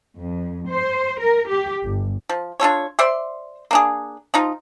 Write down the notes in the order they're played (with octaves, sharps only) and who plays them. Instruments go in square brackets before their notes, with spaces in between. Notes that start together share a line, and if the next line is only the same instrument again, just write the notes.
[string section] F2
C5
A#4
G4
G1
[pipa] F3
D4 F4 A4 C#5
C5 D5 E5 C6
A#3 D4 G#4
F3 D#4 F4